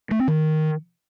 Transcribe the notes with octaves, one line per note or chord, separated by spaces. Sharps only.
A3
C4
D#3